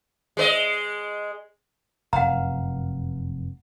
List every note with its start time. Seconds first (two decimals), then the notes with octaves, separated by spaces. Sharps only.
0.37 G#3 B4 D#5
2.13 F1 F#2 F5 F#5 A#5